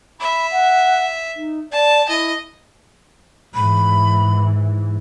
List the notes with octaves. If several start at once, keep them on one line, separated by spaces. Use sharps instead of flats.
E5 B5
F#5
D#4
D5 A5
E4 D#5
G#2 E3 B5